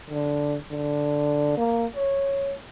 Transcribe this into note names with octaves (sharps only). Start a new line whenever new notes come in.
D3
D3
A#3
C#5